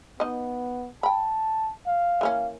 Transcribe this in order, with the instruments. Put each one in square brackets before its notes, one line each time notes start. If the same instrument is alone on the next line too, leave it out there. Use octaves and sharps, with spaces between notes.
[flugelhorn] B3 [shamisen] D#4 D#5
[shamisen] G5 B5 [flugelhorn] A5
[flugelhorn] F5
[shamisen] E3 A#3 C#4